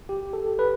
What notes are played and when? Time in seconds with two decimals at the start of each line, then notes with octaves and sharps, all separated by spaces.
0.09 G4
0.33 A4
0.59 B4